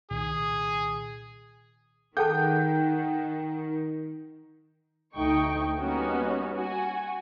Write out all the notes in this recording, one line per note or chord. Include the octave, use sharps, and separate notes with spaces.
C2 A#2 D#3 G#4
D#3 G#4 A4 F#5 G5 A5 G6
D2 A3 D#4 G5 C#6
G3 A#3 B3 C#4 D#4 F#4
F#4 G#5